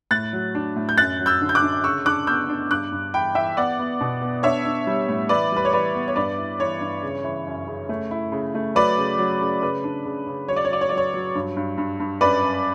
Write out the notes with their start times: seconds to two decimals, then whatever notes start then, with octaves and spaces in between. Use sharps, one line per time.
0.11 A2 F#6 A6
0.33 F#3
0.55 D4
0.76 A2
0.89 G6
0.98 F#2 F#6 A6
1.19 F#3
1.26 E6 G6
1.41 D3
1.49 G6
1.55 D6 F#6
1.62 D3
1.84 C#3 C#6 E6
2.05 D4 D6 F#6
2.27 B3 E6 G6
2.49 D4
2.70 G2 D6 F#6
2.92 G2
3.14 E3 G5 B5
3.35 E3 E5 G5
3.57 B3 D5 F#5
3.79 B3
4.01 B2
4.21 B3
4.43 D4 C#5 E5
4.65 D4
4.87 G3
5.08 A2
5.29 E3 B4 D5
5.52 G3 B4
5.65 C#5
5.73 E3 B4 D5
5.95 B3
6.08 C#5
6.16 G2 B4 D5
6.38 E4
6.60 E3 C#5
6.81 G2
7.03 C#3
7.24 E3
7.46 F#2
7.67 C#3
7.89 A3
8.11 E4
8.32 C#3
8.55 A3
8.75 F#3 B4 D5
8.98 C#3
9.18 F#3
9.41 C#3
9.62 C#3 B4
9.84 D4
10.06 C#3
10.27 C#3
10.48 F#3 C#5
10.56 D5
10.65 C#5
10.70 F#3 D5
10.81 C#5
10.89 F#3 D5
10.97 C#5
11.14 F#3
11.35 G2
11.57 G2
11.78 G2
12.00 G2
12.21 F#2 B4 D5
12.43 F#2